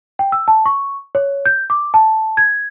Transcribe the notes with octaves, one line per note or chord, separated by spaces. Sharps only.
G5
E6
A5
C#6
C#5
G6
D6
A5
G#6